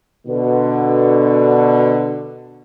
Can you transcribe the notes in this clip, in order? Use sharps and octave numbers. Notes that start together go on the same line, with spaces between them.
B2 D3